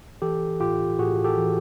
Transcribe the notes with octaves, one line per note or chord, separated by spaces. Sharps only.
E3 G4 A4
A2 F4 G4
A2 F#4 G#4
G4 A4
E3